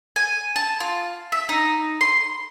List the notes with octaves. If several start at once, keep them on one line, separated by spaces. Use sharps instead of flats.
G#5
A5
F4
E5
D#4
C6